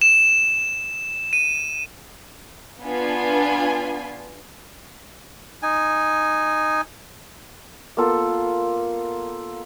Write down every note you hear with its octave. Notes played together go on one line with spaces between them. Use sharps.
E7
D#7
B3 D4 F4 G#5
D#4 G#5
A#3 B3 F4 A4